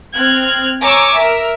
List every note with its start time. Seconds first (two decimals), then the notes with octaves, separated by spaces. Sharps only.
0.15 C4 F6 F#6 G#6
0.83 C#5 G#5 A#5 C#6 D6 E6
1.15 A#4 E5